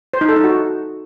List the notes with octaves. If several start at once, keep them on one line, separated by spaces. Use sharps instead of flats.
C5
D#4
A4
D#4
F#4